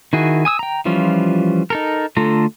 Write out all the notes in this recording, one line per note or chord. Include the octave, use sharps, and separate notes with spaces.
D#3 E4 F#4 G#4
G#5 D#6 E6
G5 A#5
E3 F3 G3 C#4 F4
D#4 A4 A#4
D3 A3 F4 A4 A#5